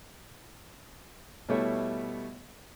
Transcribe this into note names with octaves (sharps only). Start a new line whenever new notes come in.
B2 G3 A3 E4 C#5 E5